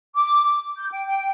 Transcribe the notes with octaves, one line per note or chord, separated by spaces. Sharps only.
D6
G6
G5
G5